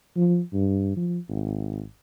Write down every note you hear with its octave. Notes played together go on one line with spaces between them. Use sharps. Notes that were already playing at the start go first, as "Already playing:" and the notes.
F3
G2
F3
G#1